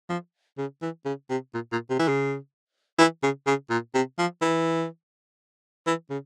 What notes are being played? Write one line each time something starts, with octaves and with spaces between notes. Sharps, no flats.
F3
C#3
E3
C#3
C3
A#2
A#2
C3
E3
C#3
E3
C#3
C#3
A#2
C3
F3
E3
E3
C#3